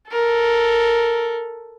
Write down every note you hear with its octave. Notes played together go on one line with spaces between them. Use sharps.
A4 A#4